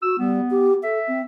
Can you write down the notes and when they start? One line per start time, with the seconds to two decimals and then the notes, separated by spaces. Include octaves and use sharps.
0.03 F#4 E6
0.19 G3 B3
0.50 G4
0.84 A4 E5
1.08 C4